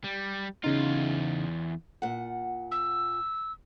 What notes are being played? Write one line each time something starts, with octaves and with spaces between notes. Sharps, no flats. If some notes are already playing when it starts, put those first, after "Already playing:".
G3
E2 C#3 D#4 F4
A#2 F#5
E6